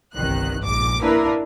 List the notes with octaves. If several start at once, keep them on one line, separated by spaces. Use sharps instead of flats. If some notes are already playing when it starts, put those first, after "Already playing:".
G1 C2 D#3 F#6
A#1 G#2 D6
A#3 D4 E4 A#4 B4